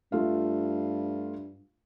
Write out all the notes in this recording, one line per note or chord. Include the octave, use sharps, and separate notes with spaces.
G2 A3 F4 F5